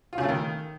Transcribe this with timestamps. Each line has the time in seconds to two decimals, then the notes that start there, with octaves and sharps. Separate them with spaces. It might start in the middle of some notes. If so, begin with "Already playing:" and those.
0.13 F4
0.18 C#3
0.23 A3
0.28 D#3